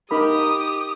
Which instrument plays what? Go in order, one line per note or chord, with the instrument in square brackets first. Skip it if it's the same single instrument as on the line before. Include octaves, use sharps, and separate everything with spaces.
[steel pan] D#4 A#4 B5 [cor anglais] G4 [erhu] D#6